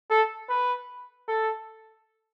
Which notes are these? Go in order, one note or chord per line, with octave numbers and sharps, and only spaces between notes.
A4
B4
A4